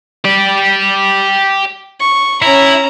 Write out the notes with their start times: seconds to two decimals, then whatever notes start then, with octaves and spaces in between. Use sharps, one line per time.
0.25 G4 D5
2.00 C#6
2.42 C#4 E4 A#5